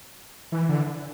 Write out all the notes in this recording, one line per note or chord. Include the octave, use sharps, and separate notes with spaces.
E3
D3